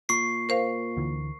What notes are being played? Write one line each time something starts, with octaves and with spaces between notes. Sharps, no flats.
A#2 C#6 C7
A#4 C5 F5
D2 D3 E3